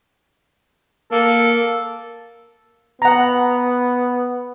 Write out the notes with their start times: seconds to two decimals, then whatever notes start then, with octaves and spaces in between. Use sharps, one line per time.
1.12 A#3 A4
3.02 B3 F#5 A#5